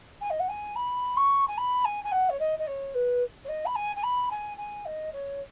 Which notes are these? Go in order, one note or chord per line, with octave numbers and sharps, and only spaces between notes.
G#5
D#5
F#5
G#5
B5
C#6
G#5
B5
G#5
G#5
F#5
C#5
D#5
D#5
C#5
B4
C#5
D#5
B5
G#5
G#5
B5
G#5
G#5
D#5
C#5